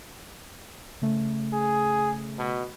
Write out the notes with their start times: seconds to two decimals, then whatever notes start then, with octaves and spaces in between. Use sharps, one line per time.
1.02 C#3 A3
1.53 G#4
2.38 B2